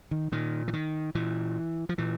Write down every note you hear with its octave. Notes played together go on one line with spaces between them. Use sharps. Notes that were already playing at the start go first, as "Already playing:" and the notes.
D#3
A#2 D#3
E3
D#3
A#2 E3
F3
A#2 E3